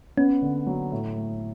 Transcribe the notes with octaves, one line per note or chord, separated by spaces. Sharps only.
B3 C#4
D3
F#3
A2
A3